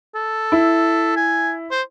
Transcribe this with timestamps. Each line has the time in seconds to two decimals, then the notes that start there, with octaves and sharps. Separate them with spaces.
0.15 A4
0.52 E4
1.16 G#5
1.71 C5